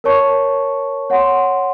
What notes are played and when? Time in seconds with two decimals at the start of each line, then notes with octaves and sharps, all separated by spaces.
0.04 A#4 C#5 A5 C#6
1.10 C#5 F#5 C6